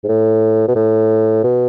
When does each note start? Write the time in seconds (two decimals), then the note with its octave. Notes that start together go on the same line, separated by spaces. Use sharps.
0.04 G#2
0.08 A2
0.68 B2
0.75 A2
1.44 B2